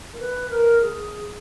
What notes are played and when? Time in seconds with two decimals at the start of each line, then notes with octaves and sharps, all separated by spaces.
0.14 A#4
0.19 B4
0.50 A#4
0.81 G#4